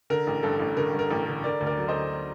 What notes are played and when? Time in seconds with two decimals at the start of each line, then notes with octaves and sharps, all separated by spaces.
0.10 D3 A#4
0.27 A1
0.43 G2 A4
0.60 A1
0.77 D3 A#4
0.93 G2
0.99 A#4
1.10 A1
1.27 D3
1.44 D3 A#4 D5
1.61 D2
1.66 A#4 D5
1.78 F#3
1.88 C5 D#5
1.95 D2